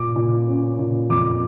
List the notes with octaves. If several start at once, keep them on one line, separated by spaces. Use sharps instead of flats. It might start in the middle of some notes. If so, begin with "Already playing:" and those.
Already playing: A#2 D6
A#2
C#4
A#2
F2 D6